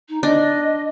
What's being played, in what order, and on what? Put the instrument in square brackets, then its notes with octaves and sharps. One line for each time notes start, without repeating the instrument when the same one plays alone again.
[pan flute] D#4
[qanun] D4 [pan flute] D#5